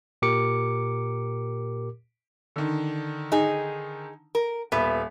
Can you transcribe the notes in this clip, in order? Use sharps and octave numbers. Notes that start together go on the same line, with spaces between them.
A#2 G4 A#4 D6 C#7
D3 D#3
D#4 G#4
A#4
D#1 B3 E5